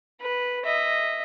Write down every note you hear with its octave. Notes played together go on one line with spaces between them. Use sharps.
B4
D#5 E5